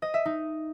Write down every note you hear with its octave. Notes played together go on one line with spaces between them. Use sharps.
D#5
E5
D#4